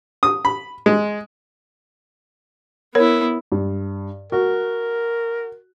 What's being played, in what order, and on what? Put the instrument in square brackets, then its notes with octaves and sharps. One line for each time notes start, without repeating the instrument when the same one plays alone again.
[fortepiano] D#6
B5
G#3
[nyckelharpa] B3 E4 [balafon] A#4 C#5
[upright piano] G2
[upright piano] F#4 [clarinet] A#4